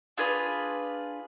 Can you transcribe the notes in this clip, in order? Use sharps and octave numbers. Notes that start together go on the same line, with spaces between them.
D4 F4 G#4 B4